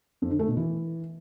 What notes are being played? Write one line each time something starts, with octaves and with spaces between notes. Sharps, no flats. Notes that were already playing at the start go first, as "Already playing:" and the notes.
F2
D3
A3
B2
E3